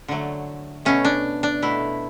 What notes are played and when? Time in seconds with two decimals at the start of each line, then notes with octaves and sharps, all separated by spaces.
0.08 D3 F#3 A3
0.85 B2 A3 C#4
1.05 D4
1.43 D4
1.62 B2 A3 E4